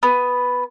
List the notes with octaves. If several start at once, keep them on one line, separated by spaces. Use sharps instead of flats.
B3